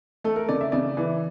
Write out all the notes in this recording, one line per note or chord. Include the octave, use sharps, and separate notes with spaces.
A3 A4
A#4
C#3 D5
E5
C#3 D5
E3